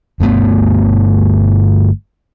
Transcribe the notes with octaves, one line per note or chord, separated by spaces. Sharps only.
G1 G2 A3 B3